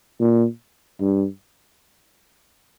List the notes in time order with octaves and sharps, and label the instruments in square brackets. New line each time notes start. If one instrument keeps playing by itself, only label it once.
[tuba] A#2
G2